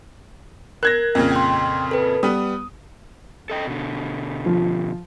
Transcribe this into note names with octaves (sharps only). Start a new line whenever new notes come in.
A#4 F#6 G#6 A#6
F2 A#2 C#3
G5 C6
A4 B4
G3 B3 D#6
A4 D#5 G5
B2 D3
F3